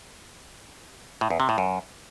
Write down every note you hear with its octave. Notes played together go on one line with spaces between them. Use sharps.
A2
E2
C3
A2
F#2